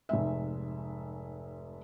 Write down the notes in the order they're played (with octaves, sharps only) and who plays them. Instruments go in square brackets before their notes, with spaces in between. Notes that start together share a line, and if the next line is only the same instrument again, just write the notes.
[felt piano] F1 G#2 G#3 E5